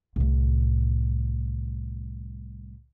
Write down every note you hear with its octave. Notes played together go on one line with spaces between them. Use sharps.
C2 A2